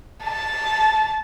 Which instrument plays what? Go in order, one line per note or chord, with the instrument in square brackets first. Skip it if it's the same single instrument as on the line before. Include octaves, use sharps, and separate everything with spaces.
[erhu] A5